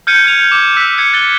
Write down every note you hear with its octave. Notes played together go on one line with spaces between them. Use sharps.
F6 G6 G#6 C#7 D#7
F6 G#6 F7
D6
E6 F#6 B6
G#6 C#7
F#6 A6 G7